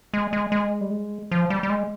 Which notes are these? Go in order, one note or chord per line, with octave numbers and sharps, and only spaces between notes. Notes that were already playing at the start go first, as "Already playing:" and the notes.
G#3
G#3
G#3
G3
G#3
F3
G3
G3
G#3